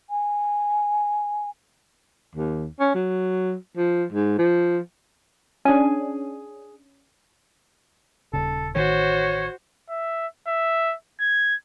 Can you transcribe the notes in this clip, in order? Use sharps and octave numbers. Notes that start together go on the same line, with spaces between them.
G#5
D#2
C#4
F#3
F3
G#2
F3
C#4 D4 G#4 G#5
D#1 C#3 A4
A1 D#3 F#4 C5 C#5
E5
E5
G#6